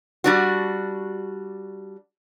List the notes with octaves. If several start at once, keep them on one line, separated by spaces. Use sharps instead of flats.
G3 D4 F#4